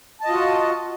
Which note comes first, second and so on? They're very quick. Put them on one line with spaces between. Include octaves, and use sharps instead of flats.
A5 D#5 F4 F#4